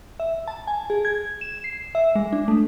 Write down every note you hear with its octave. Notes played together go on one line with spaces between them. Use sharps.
E5
A5
G#5
G#4
G#6
E7
C7
E5
G#3
D4
A3